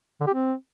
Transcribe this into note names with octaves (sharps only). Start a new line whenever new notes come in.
D3
G4
C4